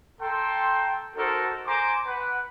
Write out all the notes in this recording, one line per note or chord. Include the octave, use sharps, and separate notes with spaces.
A4 G5 A#5 C6
D#4 F#4 A4 A#4 C5
C5 G#5 A#5 C6 D6
B4 F#5